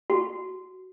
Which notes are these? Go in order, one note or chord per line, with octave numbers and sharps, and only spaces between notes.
F#4